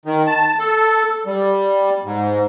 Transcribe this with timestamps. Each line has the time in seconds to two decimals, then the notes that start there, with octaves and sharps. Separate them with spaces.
0.05 D#3
0.27 A5
0.59 A4
1.26 G3
2.04 G#2